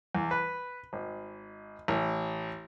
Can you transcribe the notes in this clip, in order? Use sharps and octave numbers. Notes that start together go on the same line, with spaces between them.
E2
B4
G#1
A1